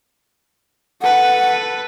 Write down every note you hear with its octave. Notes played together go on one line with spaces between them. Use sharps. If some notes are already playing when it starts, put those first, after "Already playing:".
A4 B4 F#5